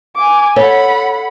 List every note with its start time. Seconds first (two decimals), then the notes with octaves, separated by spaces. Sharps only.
0.16 G#5 D6
0.56 A4 C#5 F#5 B5